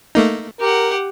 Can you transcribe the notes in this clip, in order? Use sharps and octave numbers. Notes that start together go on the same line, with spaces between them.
A3 A#3 D#4
G4 A#4 F#5